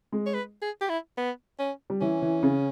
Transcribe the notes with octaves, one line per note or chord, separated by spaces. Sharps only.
G#3
C#5
B4
G#4
G4
E4
B3
C#4
G3
E3 C#4
E3
C#3